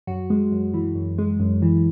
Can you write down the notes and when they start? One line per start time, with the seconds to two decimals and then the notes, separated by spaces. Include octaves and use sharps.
0.07 F#2 F#4
0.30 G#3
0.52 F#2
0.74 E3
0.95 F#2
1.18 G#3
1.40 F#2
1.62 E3